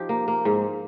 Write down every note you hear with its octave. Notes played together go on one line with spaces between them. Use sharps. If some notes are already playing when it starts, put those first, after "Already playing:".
Already playing: F3 D#4 G4
A#3
A#3
G#2